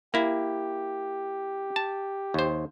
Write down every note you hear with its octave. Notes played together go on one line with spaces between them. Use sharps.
A#3 E4 G4
A5
D#2 C5